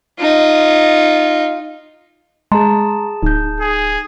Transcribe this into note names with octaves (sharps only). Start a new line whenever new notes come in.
D#4 F4
G#3 G#4 A5 A#5 C6
D1 D#4 G6
G#4